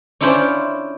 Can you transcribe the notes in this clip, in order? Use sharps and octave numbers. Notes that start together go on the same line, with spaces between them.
C#4 D4 E4 F4 C5